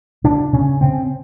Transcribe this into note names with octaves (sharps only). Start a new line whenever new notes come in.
C#3 D4
C#3 C#4
C#3 C4